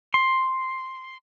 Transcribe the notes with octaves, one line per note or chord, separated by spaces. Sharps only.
C6